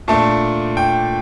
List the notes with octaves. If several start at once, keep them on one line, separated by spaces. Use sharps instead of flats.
A#2 A3 D4 A5
G5